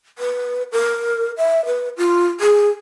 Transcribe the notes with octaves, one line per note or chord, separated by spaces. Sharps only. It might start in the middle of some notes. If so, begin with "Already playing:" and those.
B4
A#4
E5
B4
F4
G#4